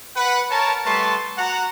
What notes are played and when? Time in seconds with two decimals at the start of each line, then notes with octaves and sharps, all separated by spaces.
0.16 B4 F#5
0.50 A#4 C#5 A5
0.85 G3 A3 B4 A5 C6 C#6
1.37 F#4 F#5 A#5